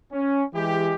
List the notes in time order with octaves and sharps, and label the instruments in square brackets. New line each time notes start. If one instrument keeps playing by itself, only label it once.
[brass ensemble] C#4
E3 G#3 G4